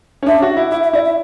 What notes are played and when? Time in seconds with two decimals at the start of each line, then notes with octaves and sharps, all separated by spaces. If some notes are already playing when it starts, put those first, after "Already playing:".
0.22 C#4
0.27 D4 E5
0.42 F#4
0.57 E4
0.71 E4 E5
0.83 E5
0.93 E4 D5
1.05 E5